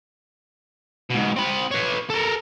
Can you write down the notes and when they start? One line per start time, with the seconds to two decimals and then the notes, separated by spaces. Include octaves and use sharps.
1.10 G#2 B2
1.36 C4 B5
1.71 B4 C#5
2.10 A4 A#4